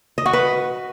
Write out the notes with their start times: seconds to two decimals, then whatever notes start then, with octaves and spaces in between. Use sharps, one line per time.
0.18 D#5
0.26 F#4
0.33 B4